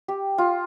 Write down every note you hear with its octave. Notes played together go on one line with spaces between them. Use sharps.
G4
F4